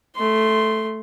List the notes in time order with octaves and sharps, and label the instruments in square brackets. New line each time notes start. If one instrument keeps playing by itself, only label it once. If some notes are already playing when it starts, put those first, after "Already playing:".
[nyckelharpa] A3 C6